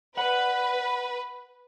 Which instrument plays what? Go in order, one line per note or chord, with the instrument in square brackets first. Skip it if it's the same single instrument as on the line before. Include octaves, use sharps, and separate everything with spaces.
[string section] B4 [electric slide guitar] D5 F#5